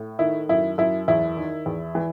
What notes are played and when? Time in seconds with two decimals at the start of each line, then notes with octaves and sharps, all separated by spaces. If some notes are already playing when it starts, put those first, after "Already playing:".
Already playing: A2
0.19 D#3 E4
0.49 F#2 E4
0.78 F#2 E4
1.08 E2 E4
1.37 D#3
1.66 E2
1.95 E3